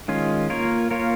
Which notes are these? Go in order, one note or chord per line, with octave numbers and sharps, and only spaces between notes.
D#3 G#3 C#4 F4
A#3 F4 A#4 C#5
A#3 F4 A#4 C#5